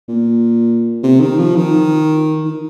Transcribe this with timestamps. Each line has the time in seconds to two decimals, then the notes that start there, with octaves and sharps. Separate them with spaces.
0.08 A#2
1.03 C3
1.21 D#3
1.38 F3
1.56 D#3
2.45 D#3